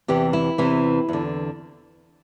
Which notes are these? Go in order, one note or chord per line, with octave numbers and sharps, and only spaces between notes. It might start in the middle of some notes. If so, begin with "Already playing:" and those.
E2 C3 E3 G4
E4
E2 C3 E3
E2 D3